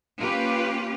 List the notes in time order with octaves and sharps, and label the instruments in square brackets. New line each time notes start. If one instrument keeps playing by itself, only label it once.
[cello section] A#3 C#4 F4 G4 B4